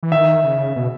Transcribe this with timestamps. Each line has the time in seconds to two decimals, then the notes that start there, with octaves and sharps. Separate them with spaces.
0.03 E3
0.12 D#3 E5
0.44 C#3
0.76 B2